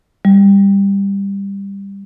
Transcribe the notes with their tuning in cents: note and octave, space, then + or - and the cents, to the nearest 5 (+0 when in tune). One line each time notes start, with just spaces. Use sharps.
G3 +15